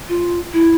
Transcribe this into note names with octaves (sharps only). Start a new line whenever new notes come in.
F4
E4